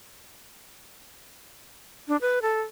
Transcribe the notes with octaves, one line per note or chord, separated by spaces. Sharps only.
D4
B4
A4